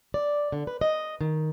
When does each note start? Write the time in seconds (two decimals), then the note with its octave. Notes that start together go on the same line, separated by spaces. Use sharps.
0.14 D5
0.52 D3
0.67 B4
0.81 D#5
1.21 D#3